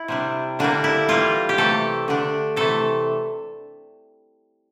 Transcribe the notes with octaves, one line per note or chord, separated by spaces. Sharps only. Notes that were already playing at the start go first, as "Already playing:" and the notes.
Already playing: E4
C3 G3 D4
D3 G3 A#3 D4
E4
E3 G3 A#3 F4
G4
C3 E3 A3 A4
D3 A3 D4
C3 E3 A3 A4